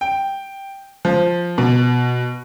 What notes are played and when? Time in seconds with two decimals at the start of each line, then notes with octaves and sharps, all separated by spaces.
0.01 G5
1.05 F3
1.58 B2